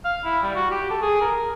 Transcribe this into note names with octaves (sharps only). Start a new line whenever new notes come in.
F5
E4
G3
F#4
G4
A4
G#4
A#4